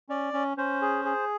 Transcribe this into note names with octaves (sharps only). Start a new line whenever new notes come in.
C#4 D5
C#4
C#4 C5
G#4
G#4